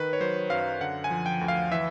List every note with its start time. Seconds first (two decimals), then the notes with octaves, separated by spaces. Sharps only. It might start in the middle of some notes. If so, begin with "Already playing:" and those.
Already playing: D#3 B4
0.13 C#5
0.20 F#3 C5
0.50 F#2 F5
0.81 D3 F#5
1.04 G#5
1.11 F3
1.26 G5
1.41 D2
1.48 F5
1.71 E3 E5